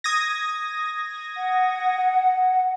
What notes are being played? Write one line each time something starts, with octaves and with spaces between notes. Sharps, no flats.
D#6 G#6 A#6
F#5